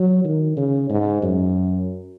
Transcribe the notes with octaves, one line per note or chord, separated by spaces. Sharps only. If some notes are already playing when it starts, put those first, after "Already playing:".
Already playing: F#3
D#3
C#3
G#2
F#2